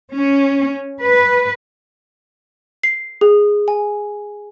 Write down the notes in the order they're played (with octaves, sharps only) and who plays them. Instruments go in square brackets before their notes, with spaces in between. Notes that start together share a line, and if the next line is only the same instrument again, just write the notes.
[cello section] C#4
B4
[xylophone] C7
G#4
G#5